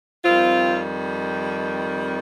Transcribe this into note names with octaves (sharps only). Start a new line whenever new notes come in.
F2 D#3 G3 C4 F4